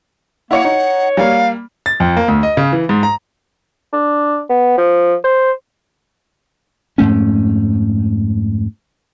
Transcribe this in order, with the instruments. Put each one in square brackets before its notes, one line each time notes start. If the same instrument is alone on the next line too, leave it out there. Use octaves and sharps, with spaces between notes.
[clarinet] A#3 [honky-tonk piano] E4 C#5 C#7 [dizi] F#5
[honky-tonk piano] D#4 [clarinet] C#5
[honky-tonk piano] G3 A#3 [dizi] F5
[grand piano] A6
F2
A#3
D2
D#5
C#3
E3
G#2
A#5
[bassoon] D4
B3
F3
C5
[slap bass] F2 G#2 A3 C#4